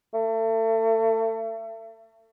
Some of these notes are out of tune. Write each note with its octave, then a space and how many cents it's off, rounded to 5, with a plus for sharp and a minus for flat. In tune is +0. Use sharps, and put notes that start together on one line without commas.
A3 +30